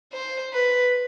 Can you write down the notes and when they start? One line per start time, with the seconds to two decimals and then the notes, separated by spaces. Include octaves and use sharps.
0.13 C5
0.53 B4